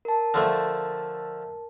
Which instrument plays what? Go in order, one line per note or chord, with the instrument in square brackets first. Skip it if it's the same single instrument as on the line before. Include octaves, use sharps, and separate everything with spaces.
[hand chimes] A#4 A5
[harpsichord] D3 F3 A3